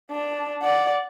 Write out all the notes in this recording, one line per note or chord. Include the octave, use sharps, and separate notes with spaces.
D4
D5 F#5